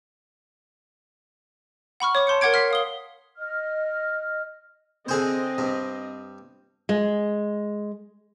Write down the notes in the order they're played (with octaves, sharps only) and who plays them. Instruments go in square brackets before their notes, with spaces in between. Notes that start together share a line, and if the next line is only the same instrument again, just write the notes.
[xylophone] F#5 B5 C#6 F6
C#5 D6
A5 C6 G6 C#7
A#4 C#5 F#5 D6 G#6 D7
C6 F6 B6 C7
F5 D#6 G7
[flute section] D#5 F6
[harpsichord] D3 G#4 C5 [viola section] C4 D#5
[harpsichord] G2
[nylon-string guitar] G#3